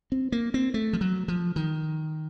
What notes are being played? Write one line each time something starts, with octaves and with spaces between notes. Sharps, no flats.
C4
A#3
C4
A3
F3
F#3
F3
D#3